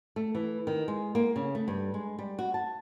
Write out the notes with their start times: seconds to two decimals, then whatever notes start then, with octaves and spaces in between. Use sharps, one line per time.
0.16 A3
0.35 E3
0.67 D#3
0.88 G#3
1.15 A#3
1.36 C#3
1.55 A3
1.68 G2
1.94 G#3
2.19 G3
2.39 F#4
2.54 A5